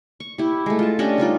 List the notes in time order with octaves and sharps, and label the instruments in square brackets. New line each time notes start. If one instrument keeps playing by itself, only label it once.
[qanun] C#6
E4 G4
G#3 A3
F4 A5
C#4 D4 G4 D#5
G3 D#4 F4 D5